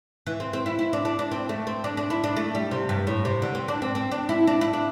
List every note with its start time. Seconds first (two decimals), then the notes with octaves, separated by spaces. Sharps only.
0.27 E3
0.40 C4
0.53 C4
0.66 E4
0.79 E4
0.93 D4
1.05 D4
1.19 D4
1.31 C4
1.49 A3
1.67 C4
1.84 D4
1.97 D4
2.10 E4
2.24 D4
2.36 A3
2.55 G3
2.71 C3
2.89 G2
3.07 A2
3.25 C3
3.42 D3
3.55 C4
3.68 D4
3.82 C4
3.95 C4
4.11 D4
4.29 E4
4.47 D4
4.61 E4
4.73 D4